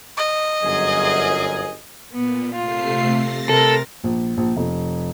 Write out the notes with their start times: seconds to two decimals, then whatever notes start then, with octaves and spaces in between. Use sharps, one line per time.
0.17 D#5
0.63 G1 F#2 G#4
2.13 A#2 B3
2.55 C3 A3 F4 C7
3.15 A6 A#6
3.49 C3 A4 A#4
4.04 A#1
4.37 A#1
4.57 F1